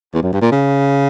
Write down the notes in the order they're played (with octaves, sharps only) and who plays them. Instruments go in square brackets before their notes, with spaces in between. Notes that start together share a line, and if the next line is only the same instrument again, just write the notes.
[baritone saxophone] E2
F#2
G2
A#2
C#3